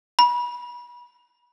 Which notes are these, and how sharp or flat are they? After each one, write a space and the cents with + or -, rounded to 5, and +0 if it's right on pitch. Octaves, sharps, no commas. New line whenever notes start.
B5 -30